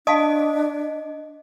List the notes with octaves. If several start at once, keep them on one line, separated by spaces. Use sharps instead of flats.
D4 D#5 F5 A5 D#6